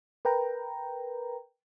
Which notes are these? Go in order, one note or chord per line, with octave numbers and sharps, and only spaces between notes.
A#4 B4 G5 A#5